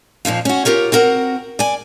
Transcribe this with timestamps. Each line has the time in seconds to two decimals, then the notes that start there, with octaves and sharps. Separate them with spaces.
0.25 F2 A#2 F3 F4
0.45 C#4 F#4
0.65 F4 G4 A#4 C#5
0.92 C4 F#4 A#4 F#5
1.59 D5 G#5